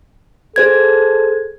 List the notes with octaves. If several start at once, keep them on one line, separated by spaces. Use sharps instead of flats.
G#4 A4 C5 G#6